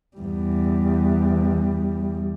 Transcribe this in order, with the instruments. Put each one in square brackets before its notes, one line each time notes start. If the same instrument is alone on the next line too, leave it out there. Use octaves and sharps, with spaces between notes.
[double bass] E2 G3